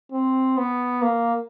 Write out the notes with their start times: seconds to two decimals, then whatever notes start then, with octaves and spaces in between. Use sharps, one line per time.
0.12 C4
0.58 B3
1.02 A#3